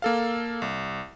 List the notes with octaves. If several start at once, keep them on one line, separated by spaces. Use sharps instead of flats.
A#3 A4 F5
C2